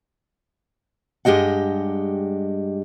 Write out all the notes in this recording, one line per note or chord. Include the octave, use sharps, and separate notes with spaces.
G2 G#3 G4 D#5 F#5